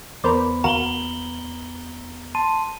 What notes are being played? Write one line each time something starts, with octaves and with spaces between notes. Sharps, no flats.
E2 B3 A#4 C5 D5 B5
D#2 A#3 F#4 A#5 F#7 G7
A5 C6 D#7